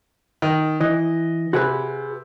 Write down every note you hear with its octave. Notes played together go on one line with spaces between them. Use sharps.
D#3
E3 D#5
C3 F#4 G#4 B4